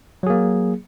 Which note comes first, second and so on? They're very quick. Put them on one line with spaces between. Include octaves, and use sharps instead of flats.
F#3 G#4 A#3